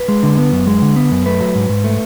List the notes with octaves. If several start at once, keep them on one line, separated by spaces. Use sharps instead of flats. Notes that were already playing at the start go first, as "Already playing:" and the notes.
Already playing: B4
G#3
D3
B3
F#2
G#3
D3
B3
F#2
A3 B4
F#3
G#2
G#2
A3